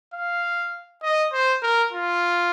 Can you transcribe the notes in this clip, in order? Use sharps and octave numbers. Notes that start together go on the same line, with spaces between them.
F5
D#5
C5
A#4
F4